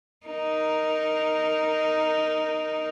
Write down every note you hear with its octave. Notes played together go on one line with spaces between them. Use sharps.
D#4 A#4